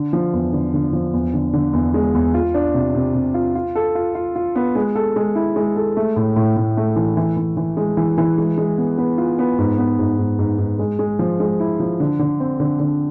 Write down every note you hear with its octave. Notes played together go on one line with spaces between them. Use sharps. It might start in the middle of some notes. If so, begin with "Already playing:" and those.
Already playing: D3
F3
E2
D3
D3
F3
E2
D3
D3
E2
G#3
E2
F4
D4
C3
C3
C3
F4
F4
A4
F4
F4
F4
B3
G#3
A4
G#3
E4
G#3
A4
A3
A2
A2
A2
A3
E3
E3
E3
E3
G#3
E3
E3
G#3
G#3
B3
B3
F4
B3
G#2
B3
G#2
G#2
G#2
G#2
G#3
G#3
F3
G#3
E4
F3
D3
D3
C4
D3
D3